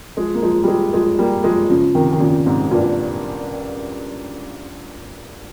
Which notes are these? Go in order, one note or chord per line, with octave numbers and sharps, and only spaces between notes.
F3 G#3
A#3
F3 G#3
G3
F3 G#3
F3 G#3
G3 A#3
F3 G#3
C#3 F3
C3 D#3
D#3
A#2 C#3
G#2 C3
G2 A#2